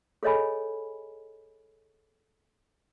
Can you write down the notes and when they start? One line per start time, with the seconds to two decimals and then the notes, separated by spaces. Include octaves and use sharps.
0.23 G#4 A4 C#5 D#5 G#5 B5